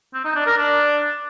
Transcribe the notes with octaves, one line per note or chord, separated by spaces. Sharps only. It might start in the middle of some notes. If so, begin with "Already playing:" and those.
C4
D#4
D4
A#4
D4